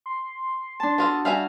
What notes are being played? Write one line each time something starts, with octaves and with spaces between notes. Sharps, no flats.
C6
D4 A5
B3 F4 F#4 A4
G3 F#4 E5 F5 G#5